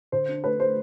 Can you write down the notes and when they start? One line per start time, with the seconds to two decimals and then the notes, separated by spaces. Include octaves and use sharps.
0.12 D3 C5
0.28 D4
0.44 A3 B4
0.60 C5